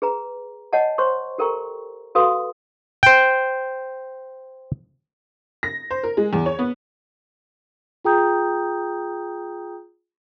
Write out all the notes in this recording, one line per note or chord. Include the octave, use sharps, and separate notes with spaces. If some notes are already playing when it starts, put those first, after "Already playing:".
G#4 B4 A#5
C#5 D#5 F#5 G#5 A5
C5 C#5 C6 C#6
G4 A4 A#4 G5 A#5 C#6
F#4 A4 B4 F5 C6 D#6
C5 G5
A#6
C5
A#4
G#3
E2
C#5
B3
F4 G#4 G5 A#5 D#6 G6